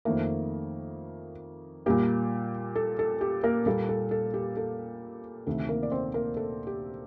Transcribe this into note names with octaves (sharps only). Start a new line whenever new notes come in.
F2 D#3 A3 A#3 A#4
A#2 G3 A#3 G4
A4
A4
G4
A#3 A#4
A#2 G3 A#3 A4
A4
A4
G4
A4
D2 C3 D#3 A3 A4
A#3 A#4
D5
C4 C5
A#3 A#4
A4
G4